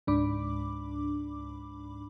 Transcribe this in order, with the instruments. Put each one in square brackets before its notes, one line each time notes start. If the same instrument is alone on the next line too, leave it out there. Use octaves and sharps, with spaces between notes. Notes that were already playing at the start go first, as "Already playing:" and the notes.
[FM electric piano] C#2 G#2 D4 B5 D6